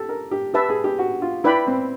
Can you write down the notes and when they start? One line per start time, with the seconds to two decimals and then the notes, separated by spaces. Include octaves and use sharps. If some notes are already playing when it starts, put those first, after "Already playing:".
Already playing: G4 A4
0.09 A#4
0.31 G4
0.54 G4 B4 E5 A5
0.69 G#4
0.84 G4
0.99 F#4
1.22 F4
1.44 E4 B4 D5 G5 B5
1.67 C4